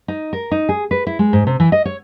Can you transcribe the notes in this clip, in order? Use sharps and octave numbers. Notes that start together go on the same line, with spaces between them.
D#4
A#4
D#4
G#4
B4
E4
G#3
G#2
C3
E3
D#5
C#5